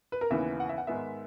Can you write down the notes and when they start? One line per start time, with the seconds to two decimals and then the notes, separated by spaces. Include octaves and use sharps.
0.12 B4
0.21 A#4
0.30 D#2 C#3 E3 B3 E5
0.60 F#5
0.69 E5
0.78 F#5
0.87 G#2 D#3 G#3 B3 E5